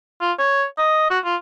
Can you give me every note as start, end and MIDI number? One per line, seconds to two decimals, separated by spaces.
0.21 0.32 65
0.39 0.65 73
0.78 1.07 75
1.10 1.19 66
1.25 1.36 65